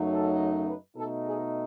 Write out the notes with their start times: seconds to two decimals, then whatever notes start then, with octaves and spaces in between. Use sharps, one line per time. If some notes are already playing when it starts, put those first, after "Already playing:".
Already playing: F#2 C#3 F#3 A3 D#4
0.09 A4
0.67 B4
0.96 B2 A3 D#4 A4
1.25 G#4